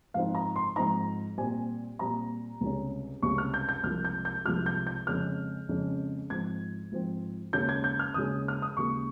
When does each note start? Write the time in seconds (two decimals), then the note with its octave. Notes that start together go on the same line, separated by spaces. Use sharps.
0.14 G#2 F3 C4 D#4 F5
0.35 A#5
0.56 C6
0.76 G#2 F3 C4 D#4 A#5
1.38 A#2 G3 C4 G#5
1.99 A#2 G3 C4 A#5
2.61 C#2 C3 G3 C#4
3.22 C#2 C3 G3 C#4 C#6
3.38 F6
3.54 G6
3.69 G6
3.83 C2 C3 F3 G#3 F6
4.05 G6
4.25 G6
4.45 C2 C3 F3 G#3 F6
4.66 G6
4.87 G6
5.07 F2 C#3 G#3 C#4 F6
5.69 F2 C#3 G#3 C#4
6.30 G#2 F3 C4 G#6
6.92 G#2 F3 C4
7.53 D#2 C#3 G#3 C#4 G6
7.69 G#6
7.84 G6
7.99 F6
8.14 D#2 C#3 G#3 C#4 D#6
8.48 F6
8.62 D#6
8.77 D#2 C#3 G#3 C#6